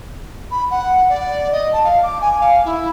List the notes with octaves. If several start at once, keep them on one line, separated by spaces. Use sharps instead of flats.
B5
F#5
D5
D#5
A5
F5
D6
G#5
F5
E4